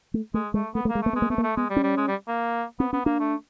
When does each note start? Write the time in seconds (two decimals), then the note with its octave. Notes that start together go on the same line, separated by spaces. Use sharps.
0.14 A3
0.34 G#3 A3
0.54 G#3 A3
0.74 A3 B3
0.85 A3
0.89 A#3
0.95 G#3
1.02 A3 A#3
1.13 G#3 B3
1.22 A#3
1.30 A3 B3
1.38 A#3
1.43 A3
1.57 G#3 B3
1.70 G3
1.76 C#4
1.83 G3
1.97 G#3
2.08 G3
2.28 A#3
2.79 B3 C4
2.93 B3 C#4
3.06 A#3 D4
3.20 A3